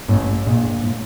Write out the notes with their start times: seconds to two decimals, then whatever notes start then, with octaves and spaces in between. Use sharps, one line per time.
0.08 A1 A2
0.46 A#1 A#2
0.84 A2